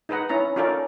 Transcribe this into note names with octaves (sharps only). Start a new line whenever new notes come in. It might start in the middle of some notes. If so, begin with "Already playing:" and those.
D#4 G#4 B4 D#5 F#5
C#4 E4 A#5
C#4 D#4 F4 A4 A#4 D5